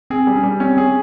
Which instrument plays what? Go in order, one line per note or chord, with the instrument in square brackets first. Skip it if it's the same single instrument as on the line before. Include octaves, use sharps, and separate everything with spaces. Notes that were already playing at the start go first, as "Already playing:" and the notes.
[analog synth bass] C4 [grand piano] G#4
[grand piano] G3
[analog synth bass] C#4
[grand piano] G3
[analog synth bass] C4 [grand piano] C#4
[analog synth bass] C4 [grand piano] G#4